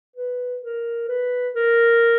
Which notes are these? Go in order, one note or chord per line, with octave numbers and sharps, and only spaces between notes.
B4
A#4
B4
A#4